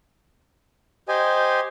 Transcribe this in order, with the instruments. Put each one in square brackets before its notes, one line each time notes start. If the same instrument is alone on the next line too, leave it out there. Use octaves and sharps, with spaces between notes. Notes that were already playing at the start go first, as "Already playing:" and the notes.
[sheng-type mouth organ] G4 C5 D#5 G#5